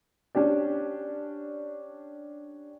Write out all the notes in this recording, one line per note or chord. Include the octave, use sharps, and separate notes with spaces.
C#4 D4 G4 D5